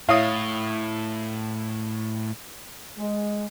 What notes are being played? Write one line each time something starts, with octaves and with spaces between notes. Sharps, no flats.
A2 E4 C#5 E5 F5 D#6
G#3